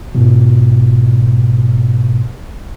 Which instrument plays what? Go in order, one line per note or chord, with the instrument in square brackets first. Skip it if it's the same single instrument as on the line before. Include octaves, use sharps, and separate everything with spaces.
[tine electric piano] G#2 B2